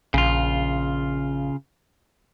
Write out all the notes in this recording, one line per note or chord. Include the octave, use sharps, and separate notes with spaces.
A#1 C#3 F4